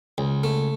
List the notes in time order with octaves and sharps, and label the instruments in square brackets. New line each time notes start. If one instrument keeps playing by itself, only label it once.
[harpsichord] C#2
A3